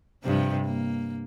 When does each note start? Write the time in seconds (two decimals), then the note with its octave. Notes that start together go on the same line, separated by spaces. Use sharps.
0.23 G2 C3 F3
0.64 A#3